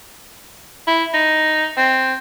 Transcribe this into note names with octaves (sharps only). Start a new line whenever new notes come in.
E4
D#4
C4